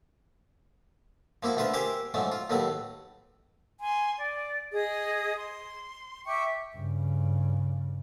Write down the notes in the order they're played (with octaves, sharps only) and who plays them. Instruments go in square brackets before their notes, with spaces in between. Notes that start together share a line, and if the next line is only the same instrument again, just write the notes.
[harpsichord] F3 A#3 E4 F#4
D2 A3 F4 B4 C5
G4 G#4 A#4 C5 E5 D6
G#2 F3 F#3 A3
F4
D#2 A2 F#3 A3 B4
[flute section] G#5 C6
D5
G#4 D#5 D#6
C6
E5 G5 C#6 D6
[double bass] G2 C#3